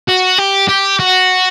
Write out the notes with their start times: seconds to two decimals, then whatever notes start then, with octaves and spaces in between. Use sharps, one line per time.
0.09 F#4
0.39 G4
0.69 G4
1.00 F#4